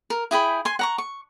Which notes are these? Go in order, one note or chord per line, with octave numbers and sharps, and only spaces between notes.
A#4
E4 G#4 G5 B5
G#5 C6
F#5 A#5 C#6
C#6